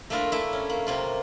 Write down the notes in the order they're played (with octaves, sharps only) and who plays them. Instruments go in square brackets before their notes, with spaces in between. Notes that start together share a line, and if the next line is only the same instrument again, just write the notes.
[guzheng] A3 A#3 D4 E4 F4 A#4
A3 A#3 E4
C#4
A#3
C3 A#3 F4